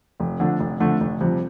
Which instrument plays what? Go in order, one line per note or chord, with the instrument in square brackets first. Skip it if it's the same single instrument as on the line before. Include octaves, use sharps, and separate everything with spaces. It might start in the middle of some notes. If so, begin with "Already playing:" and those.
[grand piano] F1
F2 D3 A3 D4
F1
F2 D3 A3 D4
F1
F2 C3 G3